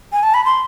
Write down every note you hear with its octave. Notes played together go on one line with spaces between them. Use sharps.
G#5
A5
B5
C6